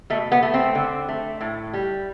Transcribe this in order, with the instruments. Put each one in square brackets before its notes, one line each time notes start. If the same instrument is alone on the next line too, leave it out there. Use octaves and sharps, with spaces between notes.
[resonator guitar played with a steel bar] B2 A3
B3
A3
C4
D3
A3
A2
G3